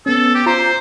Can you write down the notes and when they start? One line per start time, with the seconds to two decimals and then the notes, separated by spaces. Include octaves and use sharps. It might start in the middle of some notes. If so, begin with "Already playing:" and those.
0.06 B3 C#4 A4
0.34 G4
0.46 F4 C5 A#5